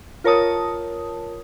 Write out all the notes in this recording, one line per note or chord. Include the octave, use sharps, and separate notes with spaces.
F4 A#4 C#5 A5 D#6